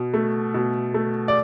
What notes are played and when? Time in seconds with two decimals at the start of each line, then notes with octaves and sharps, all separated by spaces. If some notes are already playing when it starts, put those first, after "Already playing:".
Already playing: B2
0.14 A3
0.54 B2
0.94 A3
1.28 D5